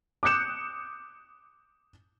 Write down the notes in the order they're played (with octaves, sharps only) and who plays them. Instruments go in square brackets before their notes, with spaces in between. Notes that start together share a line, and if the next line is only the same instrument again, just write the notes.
[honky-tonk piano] D6 D#6 F#6 G6 C#7 E7